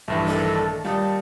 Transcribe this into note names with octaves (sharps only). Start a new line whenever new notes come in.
A#1 G2 E3 A3
D#3 D4 A4
A#2 G3 D#4 D#5 A5